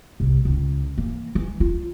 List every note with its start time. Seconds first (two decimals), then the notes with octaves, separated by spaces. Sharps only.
0.20 C2
0.45 C#2
0.98 E3 A#3
1.35 E3
1.60 F4